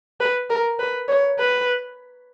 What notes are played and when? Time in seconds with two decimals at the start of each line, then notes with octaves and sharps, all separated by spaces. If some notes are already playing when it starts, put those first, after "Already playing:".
0.20 B4
0.50 A#4
0.79 B4
1.08 C#5
1.38 B4